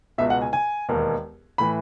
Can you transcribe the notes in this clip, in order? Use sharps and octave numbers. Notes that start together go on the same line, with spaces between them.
C#2 B2 E5
F#5
G#5
G#5
E1 D#2 D#3
A2 E3 B5